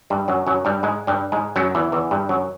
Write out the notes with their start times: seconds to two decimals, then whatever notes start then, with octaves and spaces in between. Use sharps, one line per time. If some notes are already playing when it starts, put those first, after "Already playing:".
0.10 G2 G3
0.28 F#2 F#3
0.47 F#2 F#3
0.65 G2 G3
0.83 G#2 G#3
1.07 G2 G3
1.32 G#2 G#3
1.56 F#2 F#3
1.75 E2 E3
1.92 E2 E3
2.11 G2 G3
2.29 F#2 F#3